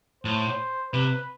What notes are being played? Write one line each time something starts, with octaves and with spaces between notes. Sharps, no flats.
A2 C5
C3 B4